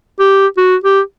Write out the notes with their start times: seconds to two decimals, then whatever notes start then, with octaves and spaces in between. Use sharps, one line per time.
0.20 G4
0.58 F#4
0.84 G4